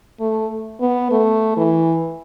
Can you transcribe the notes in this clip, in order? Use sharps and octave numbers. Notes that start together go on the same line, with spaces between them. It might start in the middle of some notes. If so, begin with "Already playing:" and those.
A3
B3
A3
E3